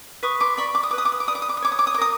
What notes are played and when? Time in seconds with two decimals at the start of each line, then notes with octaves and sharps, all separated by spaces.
0.23 B4 C#6 D#6
0.40 C6 D6
0.57 D5 B5 C#6
0.75 D6
0.83 D#6
0.91 B4 D6
0.98 D#6
1.05 D6
1.12 D#6
1.20 D6
1.27 D5 D#6
1.35 D6
1.42 D#6
1.49 D6
1.57 D#6
1.62 C#5 D6
1.72 D#6
1.79 D6
1.87 D#6
1.94 D6
1.98 A#4 D#6